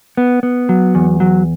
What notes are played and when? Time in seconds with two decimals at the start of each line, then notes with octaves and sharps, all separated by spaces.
0.17 B3
0.43 B3
0.69 F#3
0.95 E2
1.20 F#3